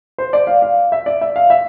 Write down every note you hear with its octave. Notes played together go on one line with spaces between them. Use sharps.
C5
D5
F5
F5
E5
D5
E5
F5
E5